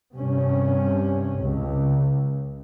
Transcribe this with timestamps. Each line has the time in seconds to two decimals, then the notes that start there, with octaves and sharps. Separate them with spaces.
0.16 G2 C3 C#4
1.37 C#2